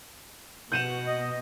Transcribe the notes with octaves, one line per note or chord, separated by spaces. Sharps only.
B2 F#5 G6 D#7 E7
D#5